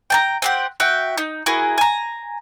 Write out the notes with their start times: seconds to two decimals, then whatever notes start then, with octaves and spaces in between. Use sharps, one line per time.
0.10 G5 A5 A#5
0.42 C4 G4 F#5
0.80 F#4 E5 G5
1.18 D#4
1.46 E4 F#4 G#4 A#4
1.78 G#5 A#5